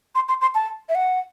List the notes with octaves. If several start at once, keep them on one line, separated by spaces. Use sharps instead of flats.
C6
C6
C6
A5
E5
F#5